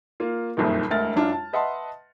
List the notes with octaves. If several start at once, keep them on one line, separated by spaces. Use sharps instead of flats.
A#3 F4
F#1 C2 F2 A#2 D#3
E1 D2 A#4 F6 A6
F#2 D4 F4
A5
B4 D#5 E5 F#5 A5 C6